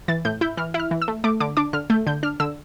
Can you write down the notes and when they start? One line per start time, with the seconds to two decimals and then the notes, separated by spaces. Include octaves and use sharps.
0.08 E3 A6
0.25 A2 G6
0.41 E4 G6
0.57 E3 F6
0.74 E4
0.80 F6
0.91 E3
1.02 E6
1.08 A3
1.24 A3 D6
1.40 D3 D6
1.57 D4 D6
1.73 D3 F6
1.90 A3 G6
2.07 D3 G6
2.23 D4 F6
2.40 D3 E6